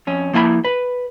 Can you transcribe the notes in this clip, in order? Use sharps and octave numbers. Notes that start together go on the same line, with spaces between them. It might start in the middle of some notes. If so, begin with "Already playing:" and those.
F2 C#4
F3 A#3 E4 G#5 B5
B4